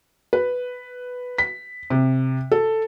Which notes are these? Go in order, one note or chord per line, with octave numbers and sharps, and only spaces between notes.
B4
B6
C3
A4